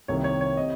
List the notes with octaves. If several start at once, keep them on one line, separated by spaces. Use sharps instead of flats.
C2 C3 D#3 A#3 C#5
C#5
C#5
C3 D#5